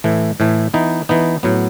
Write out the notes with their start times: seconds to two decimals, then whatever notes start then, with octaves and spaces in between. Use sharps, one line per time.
0.04 A2 E3 A3
0.40 A2 E3 A3
0.74 E3 B3 D#4
1.09 E3 B3 D#4
1.43 A2 F#3 B3